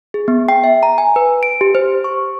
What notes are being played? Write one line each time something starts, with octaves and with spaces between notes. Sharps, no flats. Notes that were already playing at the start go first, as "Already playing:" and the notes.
G#4
B3
G5
E5
A#5
G#5
B4
D7
G4
C5
C#6